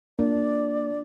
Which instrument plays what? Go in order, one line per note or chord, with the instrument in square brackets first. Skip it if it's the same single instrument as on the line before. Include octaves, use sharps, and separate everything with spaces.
[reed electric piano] A#3 [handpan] D4 F4 [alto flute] D5